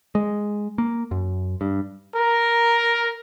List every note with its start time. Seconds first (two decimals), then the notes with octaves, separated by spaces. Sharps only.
0.15 G#3
0.78 A#3
1.11 F#2
1.61 G2
2.16 A#4